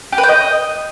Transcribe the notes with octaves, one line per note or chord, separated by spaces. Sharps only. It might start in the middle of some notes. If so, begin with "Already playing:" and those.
G4
B4
G5
D#5